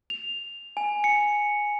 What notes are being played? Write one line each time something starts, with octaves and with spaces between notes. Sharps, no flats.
F7
G#5
C#7